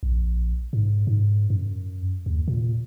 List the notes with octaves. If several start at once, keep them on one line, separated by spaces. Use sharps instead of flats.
A#1
G#2
G#2
F#2
D#2
A#2